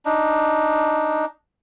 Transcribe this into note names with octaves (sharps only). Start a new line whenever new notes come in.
D4 D#4